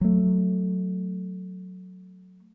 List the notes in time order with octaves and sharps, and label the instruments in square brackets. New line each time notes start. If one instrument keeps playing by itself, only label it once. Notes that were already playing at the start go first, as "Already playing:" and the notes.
[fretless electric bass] F#3 A3